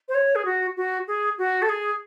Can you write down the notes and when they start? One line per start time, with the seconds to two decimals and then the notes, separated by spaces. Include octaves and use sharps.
0.08 C5
0.14 C#5
0.35 G#4
0.45 F#4
0.77 F#4
1.07 G#4
1.38 F#4
1.62 A4
1.69 G#4